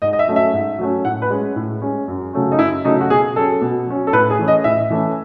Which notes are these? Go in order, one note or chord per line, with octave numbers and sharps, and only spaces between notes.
G#2 D#5
D#5
E5
F#3 A3 C#4
E5
G#2
F#3 A3 C#4
A2 F#5
B4
G#3 C#4
A2
G#3 C#4
F#2
C#3 F#3 A3 C#4
D#4
F#2 E4
C#3 F#3 A3 C#4 D#4
F#4
B2 G#4
F#3 C#4 A4
B2
F#3 C#4
A4
A2 B4
G#4
E3 A3 C#4
D#5
A2 E5
E3 A3 C#4